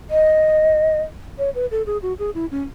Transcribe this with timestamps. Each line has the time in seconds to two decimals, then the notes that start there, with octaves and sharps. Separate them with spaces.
0.11 D#5
1.39 C#5
1.55 B4
1.71 A4
1.86 G#4
2.02 F#4
2.19 G#4
2.35 E4
2.51 C#4